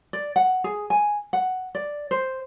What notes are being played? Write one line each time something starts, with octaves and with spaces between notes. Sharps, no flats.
D5
F#5
G#4
G#5
F#5
D5
C5